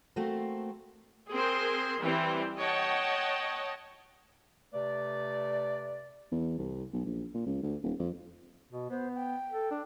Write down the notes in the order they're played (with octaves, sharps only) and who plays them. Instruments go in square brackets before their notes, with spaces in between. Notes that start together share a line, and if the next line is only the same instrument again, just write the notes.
[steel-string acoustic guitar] A3 A#3 C4 F#4 A4
[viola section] C4 G#4 A#4 C5 C6
E3 G3 C4 C5 G5
C#5 D#5 F#5 G5 A5
[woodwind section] C3 A3 B4 D5
[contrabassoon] E2
C2
B1
A#1
A#2
C#2
D2
D#1
F2
[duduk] B2
[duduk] B3 [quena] C5
[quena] G5
[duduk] A4
D4